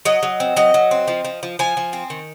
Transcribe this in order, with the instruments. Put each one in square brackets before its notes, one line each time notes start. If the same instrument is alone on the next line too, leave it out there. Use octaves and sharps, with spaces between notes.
[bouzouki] F#3 D#5
F#3
C4
F#3 D#5
F#3
C4
F3
F3
F3
F3 G#5
F3
C4
D#3